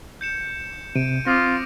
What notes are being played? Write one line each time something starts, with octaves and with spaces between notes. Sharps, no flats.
G6 C#7 E7
C3 D7 D#7
C4 F4 D6 D#6 A#6